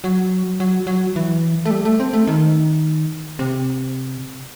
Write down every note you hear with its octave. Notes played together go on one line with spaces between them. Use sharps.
F#3
F#3
F#3
E3
A3
G3
A3
C4
A3
D#3
C3